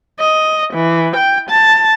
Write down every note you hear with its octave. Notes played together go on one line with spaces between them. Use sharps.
D#5
E3
G5
A5